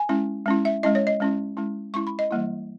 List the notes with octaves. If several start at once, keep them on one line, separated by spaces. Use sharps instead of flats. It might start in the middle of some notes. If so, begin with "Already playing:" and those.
Already playing: G#5
G#3 C#4 E4
G#3 C#4 E4
E5
G#3 C#4 E4 D#5
C#5
D#5
G#3 C#4 E4
G#3 C#4 E4
G#3 C#4 E4 C#6
B5
D#5
E3 G3 A#3 E4